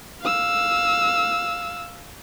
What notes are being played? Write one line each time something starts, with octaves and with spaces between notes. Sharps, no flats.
F5 E6